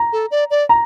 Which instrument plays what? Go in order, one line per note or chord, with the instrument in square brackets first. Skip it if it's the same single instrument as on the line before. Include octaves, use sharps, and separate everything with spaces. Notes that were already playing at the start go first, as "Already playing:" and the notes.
Already playing: [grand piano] A#5
[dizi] A4
D5
D5
[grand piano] A#5